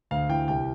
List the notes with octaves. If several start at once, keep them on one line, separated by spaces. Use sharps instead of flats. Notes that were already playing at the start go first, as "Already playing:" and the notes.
D2 F5
E3 G5
C2 G5